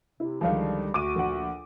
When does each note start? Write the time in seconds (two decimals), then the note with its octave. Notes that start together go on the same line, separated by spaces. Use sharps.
0.20 C3 E4
0.41 C#2 D3 D#3 F3 G3 F5
0.94 D2 F#4 D6 D#7
1.16 A#1 F#5